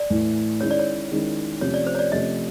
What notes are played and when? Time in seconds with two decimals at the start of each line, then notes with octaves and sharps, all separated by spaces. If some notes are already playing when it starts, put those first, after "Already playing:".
Already playing: D5
0.10 A2 E3 A3
0.61 D#3 G#3 C#4 E4 C#5
0.71 D5
0.79 C#5
1.11 D#3 G#3 C#4 E4
1.61 C3 F3 A3 C#4 C#5
1.74 D5
1.87 C5
1.95 C#5
1.99 D5
2.12 C3 F3 A3 C#4 D#5